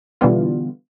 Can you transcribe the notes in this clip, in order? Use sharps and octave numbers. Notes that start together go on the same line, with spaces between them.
B2 D3 E3 G3 B3 F4